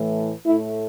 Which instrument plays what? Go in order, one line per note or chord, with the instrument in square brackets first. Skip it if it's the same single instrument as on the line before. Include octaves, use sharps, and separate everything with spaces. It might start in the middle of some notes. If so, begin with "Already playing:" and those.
Already playing: [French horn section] A2 E3 A3
A2 A3 E4